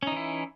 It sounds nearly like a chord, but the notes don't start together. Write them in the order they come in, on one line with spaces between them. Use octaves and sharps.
C#4 D#4 E3 E4